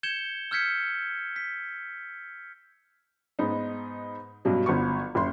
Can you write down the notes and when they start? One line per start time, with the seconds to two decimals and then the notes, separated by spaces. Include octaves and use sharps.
0.03 G6 G#6 C#7 E7 G7
0.51 E6 F6 G6 G#6 B6 C#7
1.36 B6
3.39 G#2 B3 D#4
4.45 G2 B2 F#3
4.66 G1 B3 C#6
5.15 F#1 C6